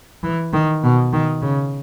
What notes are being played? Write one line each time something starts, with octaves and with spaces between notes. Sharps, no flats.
E3
D#3
B2
D#3
C#3